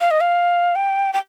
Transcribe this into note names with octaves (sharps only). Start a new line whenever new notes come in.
F5
D#5
F5
G5
G5